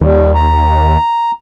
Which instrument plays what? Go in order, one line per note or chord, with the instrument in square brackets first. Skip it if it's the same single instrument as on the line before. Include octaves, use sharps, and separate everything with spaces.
[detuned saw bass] D#2 [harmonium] G3
[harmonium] A#5